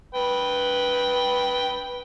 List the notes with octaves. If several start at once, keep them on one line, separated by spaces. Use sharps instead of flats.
B4 G5